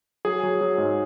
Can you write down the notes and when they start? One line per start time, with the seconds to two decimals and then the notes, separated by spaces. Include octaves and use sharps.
0.25 F#3 G#4
0.43 F#3
0.61 F#3
0.78 G#2